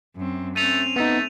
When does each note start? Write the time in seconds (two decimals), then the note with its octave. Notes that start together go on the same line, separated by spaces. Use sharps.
0.16 F#2 C4
0.56 A3 C4 C#4 D#7 F7
0.96 A3 B3 D#4